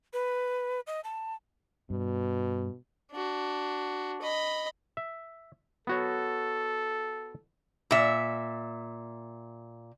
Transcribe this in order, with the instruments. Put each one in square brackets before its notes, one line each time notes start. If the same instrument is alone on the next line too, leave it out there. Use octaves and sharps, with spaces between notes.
[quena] B4
D#5
A5
[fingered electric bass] G2 [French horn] B2
[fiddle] D4 F#4
D#5 B5
[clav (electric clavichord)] E5
[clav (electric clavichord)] B3 F#4 C#5 [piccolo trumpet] A4
[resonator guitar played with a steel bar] A#2 E5